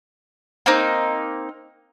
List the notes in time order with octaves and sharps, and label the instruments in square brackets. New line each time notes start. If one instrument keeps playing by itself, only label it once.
[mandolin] A#3 C4 D#4